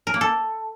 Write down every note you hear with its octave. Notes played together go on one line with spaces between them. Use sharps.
A#4
A#3
A4